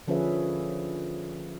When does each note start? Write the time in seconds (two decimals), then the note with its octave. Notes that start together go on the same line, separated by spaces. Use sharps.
0.08 D3 F3 C#4 G#4 B4 E5